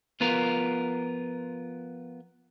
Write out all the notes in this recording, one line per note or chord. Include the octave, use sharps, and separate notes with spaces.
F3 B3 F4 A#4